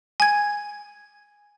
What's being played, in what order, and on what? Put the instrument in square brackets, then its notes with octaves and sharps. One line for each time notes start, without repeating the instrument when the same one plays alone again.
[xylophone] G#5 G#6